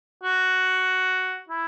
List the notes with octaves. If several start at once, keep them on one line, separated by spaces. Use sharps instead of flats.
F#4
E4